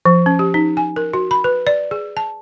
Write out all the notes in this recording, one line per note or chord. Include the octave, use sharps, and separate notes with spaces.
F3
C#4
G4
D#4
G#5
A#4
F#4
B5
B4
D5
G#4
A5